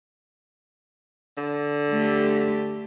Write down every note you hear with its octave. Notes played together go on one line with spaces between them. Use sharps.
D3
A3 G4